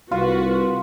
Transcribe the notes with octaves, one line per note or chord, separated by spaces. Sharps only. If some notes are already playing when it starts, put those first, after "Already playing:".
C2 F4 F#4 B4